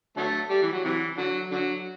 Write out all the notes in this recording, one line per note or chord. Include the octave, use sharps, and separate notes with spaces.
D3 F#3 A3
G3
E3
F#3
C3 E3
D3 F#3
D3 F#3